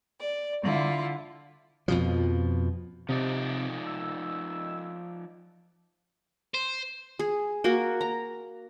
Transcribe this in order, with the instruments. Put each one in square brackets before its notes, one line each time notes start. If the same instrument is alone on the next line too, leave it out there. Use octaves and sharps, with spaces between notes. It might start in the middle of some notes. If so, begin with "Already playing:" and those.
[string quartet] D5
D3 E4 F4
[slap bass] F2 B2 F3
[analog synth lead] C3 [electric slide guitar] F3 D#4 D5
[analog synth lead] E6
[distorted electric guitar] C5
[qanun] G#4
A#3 F#4
A#5